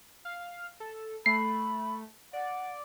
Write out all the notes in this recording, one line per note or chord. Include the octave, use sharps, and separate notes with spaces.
F5
A4
A3 B5 C7
D5 F#5